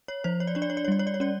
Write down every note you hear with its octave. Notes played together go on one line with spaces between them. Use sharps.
C#5
F3 C5
C#5
D5
D4 C#5
D5
C#5
D5
C#5
G3 D5
C#5
D5
C#5
C#4 D5